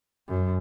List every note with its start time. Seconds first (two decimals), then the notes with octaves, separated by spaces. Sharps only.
0.28 F#2